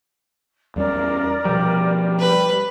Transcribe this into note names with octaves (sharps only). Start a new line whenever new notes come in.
E2 G3 C#4 A#4 D5
B2 F3 G3
B4